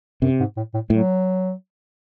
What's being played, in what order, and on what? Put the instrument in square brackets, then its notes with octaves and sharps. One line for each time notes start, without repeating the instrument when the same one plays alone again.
[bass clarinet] F#2 [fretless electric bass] C3
[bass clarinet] G#2
A2
A2
[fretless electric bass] A2 [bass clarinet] F#3